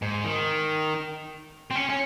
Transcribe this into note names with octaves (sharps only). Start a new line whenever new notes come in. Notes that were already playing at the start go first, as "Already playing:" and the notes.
G#2
D#3
C4
C#4
C#4